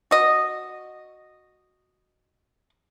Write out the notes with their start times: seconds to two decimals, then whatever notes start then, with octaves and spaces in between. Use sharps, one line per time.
0.11 F#4 D#5